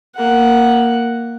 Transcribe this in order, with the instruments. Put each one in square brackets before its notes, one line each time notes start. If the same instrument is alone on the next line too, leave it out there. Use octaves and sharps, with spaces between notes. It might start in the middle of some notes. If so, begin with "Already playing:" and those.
[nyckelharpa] A#3 F#5